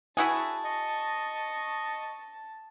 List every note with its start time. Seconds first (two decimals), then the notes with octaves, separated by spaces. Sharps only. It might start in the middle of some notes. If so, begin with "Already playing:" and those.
0.17 E4 F#4 G#4 G#5 A5
0.64 D#5 C#6